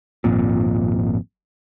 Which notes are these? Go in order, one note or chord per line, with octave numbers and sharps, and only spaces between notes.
G#1 F2 A#2